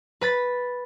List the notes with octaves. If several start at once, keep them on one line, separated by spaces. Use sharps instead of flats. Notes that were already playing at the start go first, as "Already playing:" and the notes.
B4 B5 A6 B6